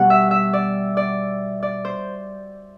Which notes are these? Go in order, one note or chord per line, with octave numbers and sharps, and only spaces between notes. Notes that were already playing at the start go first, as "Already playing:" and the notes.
Already playing: B2 G3 B3 F#5
E5
E5
D5
D5
D5
C5